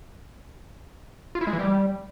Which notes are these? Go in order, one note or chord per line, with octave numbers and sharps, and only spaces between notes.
F4
E4
G#3
E3
G3